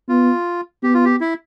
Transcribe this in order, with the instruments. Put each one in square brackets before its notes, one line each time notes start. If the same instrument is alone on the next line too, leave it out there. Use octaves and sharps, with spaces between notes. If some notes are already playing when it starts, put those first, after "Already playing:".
[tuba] B3 [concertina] F4
[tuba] B3 [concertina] G4
[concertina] F4
G4
E4